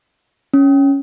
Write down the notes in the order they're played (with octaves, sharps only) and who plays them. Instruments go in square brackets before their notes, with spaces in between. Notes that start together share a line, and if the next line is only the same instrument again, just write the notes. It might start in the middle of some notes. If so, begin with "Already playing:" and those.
[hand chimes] C#4